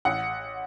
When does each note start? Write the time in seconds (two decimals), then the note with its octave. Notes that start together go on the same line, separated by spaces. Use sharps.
0.05 A1 F#5